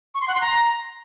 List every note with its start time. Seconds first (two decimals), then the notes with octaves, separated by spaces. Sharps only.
0.15 C#6
0.21 C6
0.28 F#5
0.34 C6
0.41 A#5